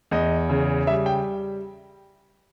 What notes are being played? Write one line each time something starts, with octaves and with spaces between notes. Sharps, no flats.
E2 D#5
C#3
G3 E5
G5